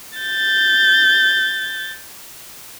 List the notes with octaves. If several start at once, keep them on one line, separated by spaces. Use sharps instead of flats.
G6 A6